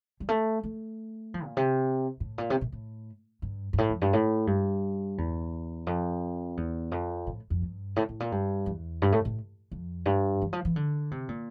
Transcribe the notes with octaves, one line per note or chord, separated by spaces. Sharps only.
G3
A3
A3
F3
A#2
C3
A2
A#2
C3
A#2
A2
G2
G2
A2
F2
G2
A2
G2
E2
F2
E2
F2
A2
F2
G2
A2
A2
A#2
G2
E2
G2
A2
A2
F2
G2
E3
F3
E3
D3
C3
A#2